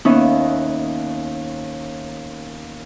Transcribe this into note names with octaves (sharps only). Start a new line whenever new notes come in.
D#2 B3 C#4 D#4 E5